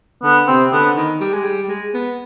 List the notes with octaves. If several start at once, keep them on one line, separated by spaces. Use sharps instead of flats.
D3 B3
C3 C4
D3 B3
D#3
G3
G#3
G3
G#3
B3